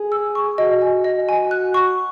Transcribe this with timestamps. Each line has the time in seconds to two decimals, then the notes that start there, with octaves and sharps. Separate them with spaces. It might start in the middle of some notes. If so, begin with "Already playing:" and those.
Already playing: G#4
0.12 E6
0.35 C#6
0.58 F#4 D#5
0.82 G#5
1.04 D#5
1.29 G#5
1.51 F#6
1.74 C#6